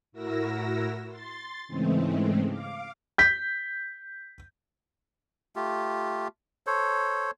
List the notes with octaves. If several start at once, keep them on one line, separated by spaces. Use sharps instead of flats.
A2 E4 F#4 A#4 E6 A#6
C6 A6
G#2 C#3 E3 G#3 A3 C4
F5 D6
G6 B6
A3 F4 G4
A4 C5 C#5